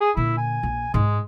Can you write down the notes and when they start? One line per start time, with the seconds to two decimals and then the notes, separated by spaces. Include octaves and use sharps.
0.01 G#4
0.17 A#2 D3 E4
0.38 G#5
0.63 A#1
0.94 G#2 G#3 D#4